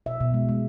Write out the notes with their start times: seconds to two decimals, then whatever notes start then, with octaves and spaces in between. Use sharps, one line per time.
0.06 B2 E5
0.21 B2
0.34 G#3
0.49 G#3